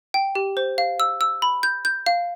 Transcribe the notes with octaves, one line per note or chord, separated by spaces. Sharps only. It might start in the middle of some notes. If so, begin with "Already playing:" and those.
G5
G4
C5
F5
E6
E6
B5
G6
G6
F5